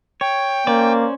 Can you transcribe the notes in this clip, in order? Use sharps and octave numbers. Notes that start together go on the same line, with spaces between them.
C#5 G5
A#3 C#4 C5 D5